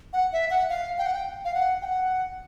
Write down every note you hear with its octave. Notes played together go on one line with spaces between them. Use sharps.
F#5
E5
F#5
F5
G5
F#5
G5
F5
F#5
G5
F#5